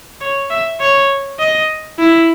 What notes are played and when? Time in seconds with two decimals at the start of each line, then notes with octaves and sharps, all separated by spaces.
0.21 C#5
0.50 E5
0.80 C#5
1.39 D#5
1.99 E4